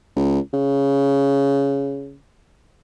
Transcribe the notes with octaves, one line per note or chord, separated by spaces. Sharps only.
C#2
C#3